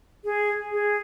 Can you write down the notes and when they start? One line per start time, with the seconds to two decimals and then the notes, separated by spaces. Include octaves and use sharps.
0.25 G#4
0.72 G#4